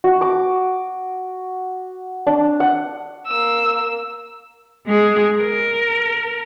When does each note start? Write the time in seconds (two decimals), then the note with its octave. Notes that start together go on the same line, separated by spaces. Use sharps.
0.04 F#4
0.21 D6
2.27 D4
2.60 F#5
3.27 A#3 E6
4.87 G#3 G#4
5.39 A#4